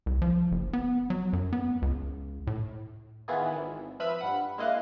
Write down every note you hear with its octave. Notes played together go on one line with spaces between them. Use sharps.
C2
F3
F#1
B3
F#3
F#2
B3
C#2
A2
D#3 E3 B3 E4 F4 G#4
G#1
F3 B4 E5 B5 E6 F6
G2 F#5 B5
G#3 A#3 E4 D#5 F5 F#6